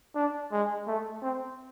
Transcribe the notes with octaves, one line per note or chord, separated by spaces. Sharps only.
D4
G#3
A3
C4